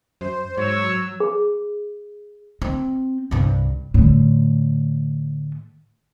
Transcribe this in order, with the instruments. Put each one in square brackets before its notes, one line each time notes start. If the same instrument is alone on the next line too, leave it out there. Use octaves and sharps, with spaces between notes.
[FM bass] F#2 [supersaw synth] C5
[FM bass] G#2 [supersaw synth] F#3 E6 [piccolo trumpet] C#5
[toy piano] G#4
[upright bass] C4
C2 G2
A2 D3